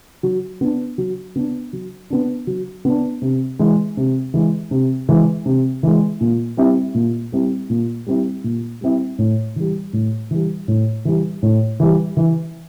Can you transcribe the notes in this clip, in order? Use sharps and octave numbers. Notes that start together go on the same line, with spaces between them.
F#3
B3 D4
F#3
B3 D4
F#3
B3 D4
F#3
B3 D4
C3
E3 G#3
C3
E3 G#3
C3
E3 G#3
C3
E3 G#3
A#2
G3 C4 E4
A#2
G3 C4 E4
A#2
G3 C4 E4
A#2
G3 C4 E4
A2
E3 G3
A2
E3 G3
A2
E3 G3
A2
E3 G3
E3